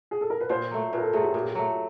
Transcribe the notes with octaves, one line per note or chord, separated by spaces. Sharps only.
G#4
A4
A#4
B4
A#2 C5
F#3 A3
A#2 A#4 B4
A4
F#3 A3 G#4
G4
A#2 G#4
G4
F#3 A3